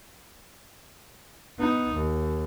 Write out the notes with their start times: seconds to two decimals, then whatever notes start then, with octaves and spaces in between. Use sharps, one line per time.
1.58 B3 D#4
1.95 D#2